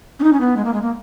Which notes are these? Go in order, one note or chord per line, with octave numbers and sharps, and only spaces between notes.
C#4
D#4
C#4
B3
G#3
A#3
G#3
A#3